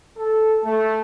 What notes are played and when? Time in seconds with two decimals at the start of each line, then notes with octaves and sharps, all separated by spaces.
0.18 A4
0.64 A3